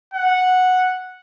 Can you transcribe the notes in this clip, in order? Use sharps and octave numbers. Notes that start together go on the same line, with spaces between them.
F#5